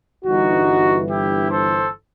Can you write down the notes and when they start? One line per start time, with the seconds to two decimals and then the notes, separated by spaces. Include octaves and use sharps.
0.25 G1 G2 E3 D#4 F#4
1.08 E4 G4
1.50 A4 C5